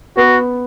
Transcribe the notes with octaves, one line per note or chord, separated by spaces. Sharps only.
B3 F#4